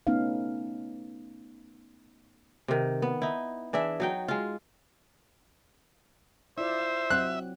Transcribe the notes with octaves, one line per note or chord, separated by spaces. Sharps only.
A3 B3 C#4 D#4 F5
C3 D#3
B3
D#4 E4
E3 D4 G#4 E5
F#3 D#4 G5
G#3 F4
E4 F4 C5 D5 E5
F#3 C4 F#5 F#6